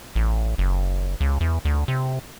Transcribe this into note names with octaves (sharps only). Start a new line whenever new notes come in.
A1
F#1
C#2
E2
D2
C3